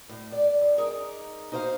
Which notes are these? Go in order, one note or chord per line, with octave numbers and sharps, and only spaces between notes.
A2
D5
G2
D#4 G#4 A#4 D5
D#4 F#4 C5 D5 F5